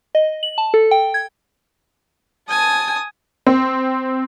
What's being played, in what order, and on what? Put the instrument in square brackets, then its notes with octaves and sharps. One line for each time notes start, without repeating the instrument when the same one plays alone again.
[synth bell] D#5
F#7
A5
A4
G5
G#6
[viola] G#5 [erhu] A5 [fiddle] D#6
[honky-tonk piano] C4